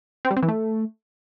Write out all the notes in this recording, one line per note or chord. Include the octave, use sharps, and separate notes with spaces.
C4
G3
C4
E3
A3